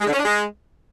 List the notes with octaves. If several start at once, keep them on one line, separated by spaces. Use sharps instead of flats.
G#3
D3
C#4
D4
G#3